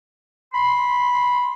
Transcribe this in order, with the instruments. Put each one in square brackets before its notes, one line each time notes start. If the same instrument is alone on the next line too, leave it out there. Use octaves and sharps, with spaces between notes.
[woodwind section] B5 C6